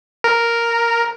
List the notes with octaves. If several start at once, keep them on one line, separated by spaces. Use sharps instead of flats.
A#4